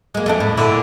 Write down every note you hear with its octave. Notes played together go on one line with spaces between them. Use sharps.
G#3 A#3
F2 A3 D4
A2
A#2 D3 E4